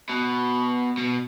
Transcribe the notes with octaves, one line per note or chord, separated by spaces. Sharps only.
B2
B2